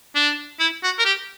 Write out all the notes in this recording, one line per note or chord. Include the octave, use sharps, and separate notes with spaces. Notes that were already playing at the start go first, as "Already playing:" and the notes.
D4
E4
F#4
A#4
G4